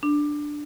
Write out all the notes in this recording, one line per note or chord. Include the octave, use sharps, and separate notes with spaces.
D4